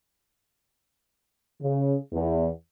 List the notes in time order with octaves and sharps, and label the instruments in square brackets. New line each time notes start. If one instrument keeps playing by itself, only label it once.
[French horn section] C#3
E2